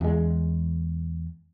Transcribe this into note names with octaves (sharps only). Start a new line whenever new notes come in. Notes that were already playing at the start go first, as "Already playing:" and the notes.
E2 G#3